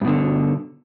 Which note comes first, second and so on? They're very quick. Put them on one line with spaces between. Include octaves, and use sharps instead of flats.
G2 B2 D3